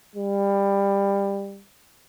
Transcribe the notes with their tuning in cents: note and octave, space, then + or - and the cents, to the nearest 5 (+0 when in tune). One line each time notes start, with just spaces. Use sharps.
G3 +20